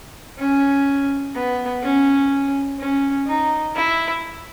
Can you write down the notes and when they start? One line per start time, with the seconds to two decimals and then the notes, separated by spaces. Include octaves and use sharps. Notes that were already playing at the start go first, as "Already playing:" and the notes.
0.38 C#4
1.34 B3
1.82 C#4
2.79 C#4
3.27 D#4
3.75 E4